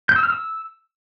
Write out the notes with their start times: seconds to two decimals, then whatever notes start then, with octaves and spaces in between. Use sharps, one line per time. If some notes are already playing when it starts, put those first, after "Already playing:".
0.09 G6
0.16 E6
0.23 F6
0.30 E6